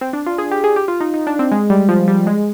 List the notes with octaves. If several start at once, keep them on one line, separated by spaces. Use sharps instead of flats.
C4
D4
F4
G#4
G4
G#4
G4
F4
D#4
D#4
D4
C4
G#3
G3
F3
G3
G#3